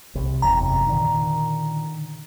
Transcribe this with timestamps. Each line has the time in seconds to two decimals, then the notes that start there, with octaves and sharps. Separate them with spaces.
0.15 C2
0.42 F#1 E2 C3 A#5
0.87 A#2 D3 D#3